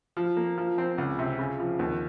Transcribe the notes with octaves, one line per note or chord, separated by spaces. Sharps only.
F3
A#3
F3
C4
C#2
C3
C#3
F3
D#2